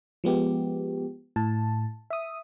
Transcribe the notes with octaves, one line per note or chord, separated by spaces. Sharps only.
F3 G#3 B3 G4
A2 A5
E5 D#6